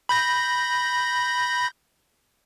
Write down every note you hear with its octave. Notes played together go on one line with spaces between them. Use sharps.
B5 G6 A#6